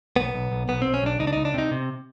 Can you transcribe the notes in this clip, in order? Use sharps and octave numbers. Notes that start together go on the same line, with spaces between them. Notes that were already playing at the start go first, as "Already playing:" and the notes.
B1 B3
B1
B1
B1 B3
B1 C4
C#4
B1 D4
C#2 D#4
D4
C#2 D#4
D4
C3 D#4
C3